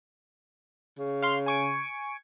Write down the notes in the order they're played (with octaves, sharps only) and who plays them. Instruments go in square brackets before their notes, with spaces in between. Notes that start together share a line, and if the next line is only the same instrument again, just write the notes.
[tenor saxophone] C#3
[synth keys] F5 C6
G#5 C#6 D7